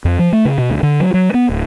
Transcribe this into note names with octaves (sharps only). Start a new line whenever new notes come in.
F2
F3
A3
C#3
B2
D2
D3
F#3
F#3
B3
D1